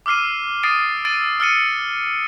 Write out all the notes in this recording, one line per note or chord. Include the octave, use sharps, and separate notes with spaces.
D6 E6 F6 C7 D#7
D#6 A6 C7 D7 D#7
E6 A6 D7 D#7
E6 F6 A6 C#7 D#7